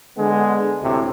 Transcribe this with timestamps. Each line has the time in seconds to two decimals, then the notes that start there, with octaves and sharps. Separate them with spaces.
0.16 D3 G#3 B3
0.81 D2 A2 C3